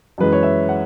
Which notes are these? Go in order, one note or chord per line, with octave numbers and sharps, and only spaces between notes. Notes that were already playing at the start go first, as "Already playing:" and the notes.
F#2 E3 G#3 B4
C#5
E5
F#5